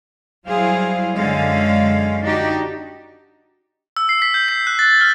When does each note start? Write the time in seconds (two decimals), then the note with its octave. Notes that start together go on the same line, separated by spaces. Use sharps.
0.47 F#3 G3 E4 G#4 C5 F5
1.14 F#2 D3 G#3 C#4 F5
2.23 D4 D#4 F#4 G4
3.97 E6
4.09 C7
4.22 B6
4.34 G6
4.48 B6
4.67 F#6
4.79 A6
5.01 F6